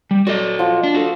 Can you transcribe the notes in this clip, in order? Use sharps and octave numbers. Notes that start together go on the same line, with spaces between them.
G3
F#4 A4 D5 D#5
F3 F#5
D4
F#4 A4